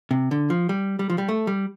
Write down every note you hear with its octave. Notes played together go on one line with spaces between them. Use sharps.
C3
D3
F3
G3
G3
F3
G3
A3
G3